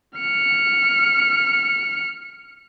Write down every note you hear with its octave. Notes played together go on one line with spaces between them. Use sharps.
F6 C#7